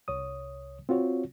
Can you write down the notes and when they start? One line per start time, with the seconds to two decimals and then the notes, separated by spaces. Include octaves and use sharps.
0.08 C2 C#5 D#6
0.89 C4 F4 F#4 C#5